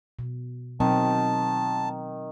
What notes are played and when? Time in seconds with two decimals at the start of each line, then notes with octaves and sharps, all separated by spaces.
0.19 B2
0.80 B2 D#3 F#3 C4 A5